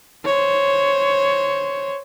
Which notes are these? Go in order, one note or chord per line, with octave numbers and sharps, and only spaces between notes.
C5 C#5